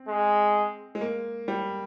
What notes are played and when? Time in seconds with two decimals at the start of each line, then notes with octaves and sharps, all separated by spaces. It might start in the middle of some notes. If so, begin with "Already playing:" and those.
Already playing: C4
0.08 G#3
0.95 G#3
1.01 A#3
1.48 G3